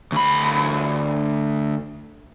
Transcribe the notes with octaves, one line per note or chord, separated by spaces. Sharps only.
D2 B5